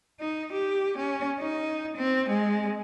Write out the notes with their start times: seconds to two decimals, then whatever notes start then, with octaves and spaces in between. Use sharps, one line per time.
0.20 D#4
0.53 G4
0.98 C#4
1.40 D#4
1.97 C4
2.29 G#3